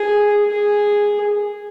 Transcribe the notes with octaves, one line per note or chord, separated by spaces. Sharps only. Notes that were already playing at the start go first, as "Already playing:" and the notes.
Already playing: G#4
G#4